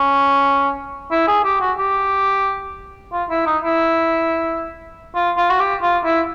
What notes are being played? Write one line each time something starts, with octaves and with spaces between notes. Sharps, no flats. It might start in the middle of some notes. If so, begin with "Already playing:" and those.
Already playing: C#4
E4
G#4
G4
F#4
G4
F4
E4
D#4
E4
F4
F4
F#4
G4
F4
E4